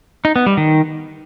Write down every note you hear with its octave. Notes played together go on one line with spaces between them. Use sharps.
D#4
B3
G3
D#3